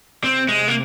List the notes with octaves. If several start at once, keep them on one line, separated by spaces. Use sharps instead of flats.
C3 C4
G#3
A#3